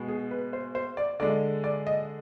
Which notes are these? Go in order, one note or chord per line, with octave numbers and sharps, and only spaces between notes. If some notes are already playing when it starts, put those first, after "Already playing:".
Already playing: B2 G#3
G#4
B4
C5
C5
D5
D3 G#3 D5
D5
D#5